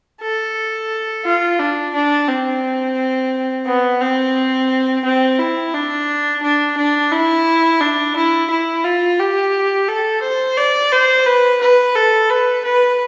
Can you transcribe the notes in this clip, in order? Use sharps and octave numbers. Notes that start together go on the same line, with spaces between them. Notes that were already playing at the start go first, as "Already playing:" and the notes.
A4
F4
D4
D4
C4
B3
C4
C4
E4
D4
D4
D4
E4
D4
E4
E4
F4
G4
A4
C5
D5
C5
B4
B4
A4
B4
B4